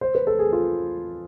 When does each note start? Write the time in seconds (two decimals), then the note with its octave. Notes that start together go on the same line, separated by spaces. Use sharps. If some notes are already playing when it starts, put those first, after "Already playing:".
0.01 C5
0.15 B4
0.27 A4
0.39 G#4
0.52 F4